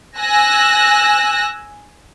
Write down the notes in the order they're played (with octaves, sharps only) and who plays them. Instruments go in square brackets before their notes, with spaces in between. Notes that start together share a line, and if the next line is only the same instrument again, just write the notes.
[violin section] G#5 E6 F#6 A#6